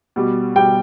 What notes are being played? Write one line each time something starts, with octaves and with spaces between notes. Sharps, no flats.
B2 G3
B2 G3 G5